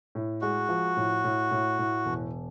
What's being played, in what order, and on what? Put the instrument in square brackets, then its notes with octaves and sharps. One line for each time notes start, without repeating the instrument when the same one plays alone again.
[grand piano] A2
[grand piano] G#3 [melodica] F#4
[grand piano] F3
A2
A2
A2
A2
E1